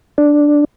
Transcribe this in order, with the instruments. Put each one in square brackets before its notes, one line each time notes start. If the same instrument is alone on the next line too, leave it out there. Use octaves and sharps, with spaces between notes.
[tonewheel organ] D4